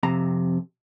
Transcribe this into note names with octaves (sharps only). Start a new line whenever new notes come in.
F2 C3 A#5